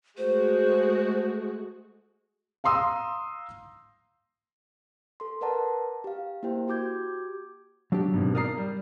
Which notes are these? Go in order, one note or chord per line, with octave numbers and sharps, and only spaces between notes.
G#3 A3 F#4 C5
F5 A#5 C6 D#6 E6
A4 C6
A#4 B4 D5 F#5 A5 A#5
G4 F5
A#3 E4 G4 C5 G5
F#4 G4 D6 G6 G#6
F#3 D4 G4
G#1 B2
A#4 D5 A#5 D#6 C7
G3